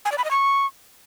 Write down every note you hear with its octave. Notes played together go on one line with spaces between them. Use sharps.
G#5
D5
B5
D#5
C#6